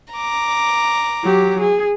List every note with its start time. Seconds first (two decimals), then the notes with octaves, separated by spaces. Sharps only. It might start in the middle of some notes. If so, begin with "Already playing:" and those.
0.13 A#5 D6
1.23 F#3 G4
1.61 G#4